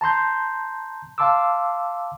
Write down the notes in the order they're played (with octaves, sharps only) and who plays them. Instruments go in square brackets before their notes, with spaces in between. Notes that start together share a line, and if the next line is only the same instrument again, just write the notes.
[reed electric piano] A5 A#5 C6 G6
F5 A5 C6 D6 E6